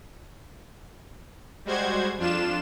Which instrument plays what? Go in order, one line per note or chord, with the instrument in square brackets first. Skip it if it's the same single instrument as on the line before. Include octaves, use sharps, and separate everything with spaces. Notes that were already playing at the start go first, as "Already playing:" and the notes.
[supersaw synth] G3 G#3 F#4 C5 G#6
F2 D4 F4 E7